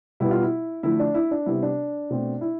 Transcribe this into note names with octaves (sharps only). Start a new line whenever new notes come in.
B2 G3 B3 E4
F4
E4
D3 F3 A3 E4
D4
E4
D4
C3 G3 B3 E4
D4
B2 A3 C4
E4